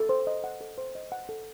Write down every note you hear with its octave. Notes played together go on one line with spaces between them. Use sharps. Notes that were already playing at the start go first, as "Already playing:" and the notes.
Already playing: A4
C5
D#5
F#5
A4
C5
D#5
F#5
A4